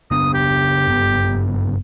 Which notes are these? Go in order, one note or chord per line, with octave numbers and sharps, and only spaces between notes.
C#3 B3 D4 D#6
G4
F#1 G2 B3